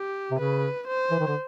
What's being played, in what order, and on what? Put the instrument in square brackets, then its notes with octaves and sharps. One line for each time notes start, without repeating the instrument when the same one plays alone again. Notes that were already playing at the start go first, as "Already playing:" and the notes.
Already playing: [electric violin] G4
[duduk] C3
[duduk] C#3 [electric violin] B4
[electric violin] C5
[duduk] E3
D#3
D3